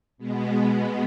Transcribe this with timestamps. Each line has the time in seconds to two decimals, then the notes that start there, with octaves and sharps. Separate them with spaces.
0.17 B2 G#3 B3